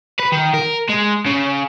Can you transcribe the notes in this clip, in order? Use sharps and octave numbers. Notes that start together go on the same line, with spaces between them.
B4
D#3
A#4
G#3
C#3